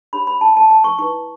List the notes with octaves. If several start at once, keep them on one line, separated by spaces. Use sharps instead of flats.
D4 G4 C#5 B5
B5
A5
A5
A5
C#6
E4 B4 C#6